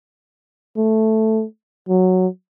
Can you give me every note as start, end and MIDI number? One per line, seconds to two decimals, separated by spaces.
0.77 1.44 57
1.89 2.27 54